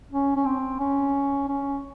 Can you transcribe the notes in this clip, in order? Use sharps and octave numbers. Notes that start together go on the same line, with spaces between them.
C#4
C#4
C4
C#4
C#4